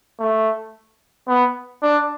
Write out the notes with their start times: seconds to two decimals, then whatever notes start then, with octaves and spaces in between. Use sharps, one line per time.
0.20 A3
1.28 B3
1.83 D4